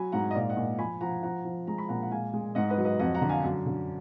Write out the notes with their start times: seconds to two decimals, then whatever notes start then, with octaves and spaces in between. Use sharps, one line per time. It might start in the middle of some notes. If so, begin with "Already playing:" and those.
Already playing: F#3 G#5 B5
0.12 G#2 F#5 A#5
0.31 D#5
0.34 A#2 D5 F5
0.50 D#5 F#5
0.57 A#2
0.79 F3 G#5 B5
1.01 F3 F#5 A#5
1.23 F3 F#5 A#5
1.45 F3
1.67 G#3 A#5
1.78 B5
1.89 A#2 F#5 A#5
2.03 F#5
2.11 G#3 F5 G#5
2.33 G#3
2.55 G#2 D#5 F#5
2.70 B4 D#5
2.78 F#3
2.85 B4 D#5
2.99 F2 D#5 F#5
3.15 F#5 A#5
3.22 D3
3.29 F5 G#5
3.44 F#2
3.66 D3